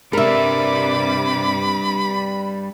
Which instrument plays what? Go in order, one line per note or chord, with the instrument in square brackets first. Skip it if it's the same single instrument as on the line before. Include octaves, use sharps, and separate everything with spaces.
[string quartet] C3 D6 [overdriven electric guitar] G3 D4 [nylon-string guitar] A#4 E5 [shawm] B5